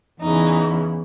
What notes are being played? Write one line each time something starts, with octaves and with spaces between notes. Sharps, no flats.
E2 C#3 E3 D#4